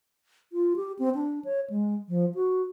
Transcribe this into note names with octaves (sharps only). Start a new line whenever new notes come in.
F4
G4
C4
D4
C#5
G#3
F3
F#4